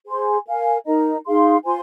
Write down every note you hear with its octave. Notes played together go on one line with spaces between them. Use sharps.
G#4 C5 G#5 C6
A#4 F5 G#5
D#4 A#4 D#5 A#5
D#4 G#4 F5 C6
F4 C5 G#5 C6